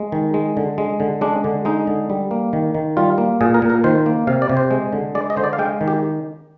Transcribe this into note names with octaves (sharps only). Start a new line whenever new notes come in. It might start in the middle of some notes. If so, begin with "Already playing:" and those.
Already playing: G#3
D#3
G#3
D3
G#3
D3
G#3 D4
D3
G#3 D#4
D3
G3
A#3
D#3
D#3
G3 F4
A#3
A#2 G#4
A#4
A#2
A#4
D#3 C5
A#3
C3 F5
D5
C3
C5
G#3
D3
G#3 D5
D#5
D3 C5
D5
F5
G#3 G5
D#3
G4